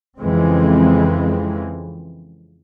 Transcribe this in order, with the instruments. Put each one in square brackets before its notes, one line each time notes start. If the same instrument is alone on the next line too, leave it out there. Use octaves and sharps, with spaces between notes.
[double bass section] F2 C#3 E3 G#3 C4